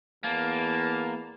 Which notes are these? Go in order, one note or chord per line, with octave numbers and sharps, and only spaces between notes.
E2 A#3 A5